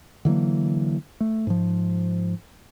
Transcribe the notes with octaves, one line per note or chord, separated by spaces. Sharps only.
D3 E3 F#3 A#3
A3
G#2 F3